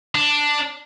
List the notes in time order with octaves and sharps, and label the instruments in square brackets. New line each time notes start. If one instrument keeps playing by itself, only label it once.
[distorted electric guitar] D4